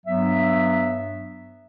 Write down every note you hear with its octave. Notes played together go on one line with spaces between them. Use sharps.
G2 F#3 B3 E5